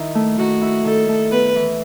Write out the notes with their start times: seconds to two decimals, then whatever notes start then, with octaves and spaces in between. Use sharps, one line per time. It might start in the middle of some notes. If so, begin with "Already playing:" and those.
Already playing: D#3 E4
0.15 A3
0.38 D#3 F#4
0.62 E4
0.85 D#3 A4
1.08 A3
1.32 B3 B4
1.56 E3